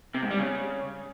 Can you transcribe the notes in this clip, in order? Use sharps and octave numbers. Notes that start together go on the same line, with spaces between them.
C3
G#2
G3
C#3